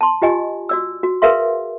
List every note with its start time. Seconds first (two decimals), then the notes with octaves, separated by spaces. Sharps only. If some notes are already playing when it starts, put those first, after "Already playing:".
0.01 A5 C6
0.22 F4 G4 D#5 G#5
0.69 F#4 D5 E6
1.03 F#4
1.22 G#4 A#4 B4 E5 F5 C6